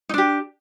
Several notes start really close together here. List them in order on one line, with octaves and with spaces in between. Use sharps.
D#4 D4 G4